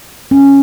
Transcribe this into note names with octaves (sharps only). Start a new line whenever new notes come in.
C#4